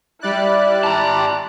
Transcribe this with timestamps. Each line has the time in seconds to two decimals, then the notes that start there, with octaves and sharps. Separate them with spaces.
0.21 G3 E4 D5 F#6
0.83 A5 A#5